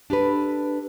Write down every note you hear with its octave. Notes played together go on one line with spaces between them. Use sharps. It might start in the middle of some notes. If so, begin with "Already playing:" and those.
D4 G4 A4 B4